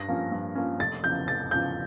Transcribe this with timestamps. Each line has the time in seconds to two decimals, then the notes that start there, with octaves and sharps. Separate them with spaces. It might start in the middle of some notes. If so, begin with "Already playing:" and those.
Already playing: G2 A#6
0.08 F3 A#3 C#4
0.32 G2
0.55 F3 A#3 C#4
0.79 F1 A6
1.03 E2 C#3 F3 G6
1.28 F1 A6
1.51 E2 C#3 F3 G6